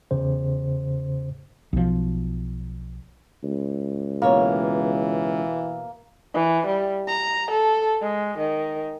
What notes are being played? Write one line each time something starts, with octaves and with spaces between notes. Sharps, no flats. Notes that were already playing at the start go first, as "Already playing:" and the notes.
E2 C#3 C5
B1 F3
C#2
B2 E3 A#3 C#5
E3
G3
A#5
A4
G#3
D#3